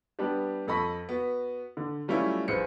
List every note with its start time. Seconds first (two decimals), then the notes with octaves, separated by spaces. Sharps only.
0.19 G3 B3 D4 G4
0.67 F2 A4 D#5 B5 C#6 B6
1.09 B3 F#4
1.77 D3
2.08 F#3 G3 A3 C#4 E4 F4
2.48 A#1 G#4 B4 C5 C7 C#7